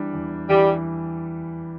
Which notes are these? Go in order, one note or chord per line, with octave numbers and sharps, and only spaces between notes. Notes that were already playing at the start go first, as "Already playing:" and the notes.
Already playing: E3 G3 D4
E2
E3 G3